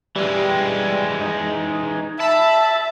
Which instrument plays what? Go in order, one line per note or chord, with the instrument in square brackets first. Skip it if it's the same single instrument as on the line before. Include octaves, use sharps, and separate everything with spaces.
[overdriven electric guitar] E3 G#3 [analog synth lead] G3
[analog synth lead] D#4
[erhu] E5 [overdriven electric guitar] A5 [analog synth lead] B5